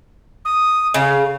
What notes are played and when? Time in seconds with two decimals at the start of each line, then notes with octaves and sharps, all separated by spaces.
0.45 D#6
0.94 C#3 F5